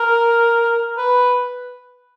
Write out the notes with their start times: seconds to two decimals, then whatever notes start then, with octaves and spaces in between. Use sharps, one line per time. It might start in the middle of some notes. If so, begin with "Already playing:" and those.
Already playing: A#4
0.98 B4